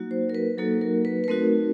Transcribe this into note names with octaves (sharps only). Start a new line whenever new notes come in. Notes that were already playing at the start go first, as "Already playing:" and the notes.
Already playing: F#3 A#3 D#4 F#4
C5
A#4
B4
F#3 A#3 D#4 F#4 A4
A#4
B4
B4
A3 C4 D#4 F#4 A#4